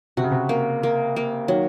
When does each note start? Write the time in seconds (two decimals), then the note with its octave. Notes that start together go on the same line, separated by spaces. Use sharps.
0.17 C3 F#4
0.24 C#3
0.31 C3
0.49 A#3
0.83 A#3
1.16 A#3
1.48 D#3 F#3